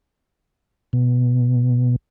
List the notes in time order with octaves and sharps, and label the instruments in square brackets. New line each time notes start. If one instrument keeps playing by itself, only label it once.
[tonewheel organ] B2